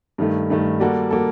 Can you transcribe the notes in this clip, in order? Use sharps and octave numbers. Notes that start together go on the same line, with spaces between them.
G2 D#3 A3
G2 D#3 A3
G3 A#3 F#4 A4
G3 A#3 F#4 A4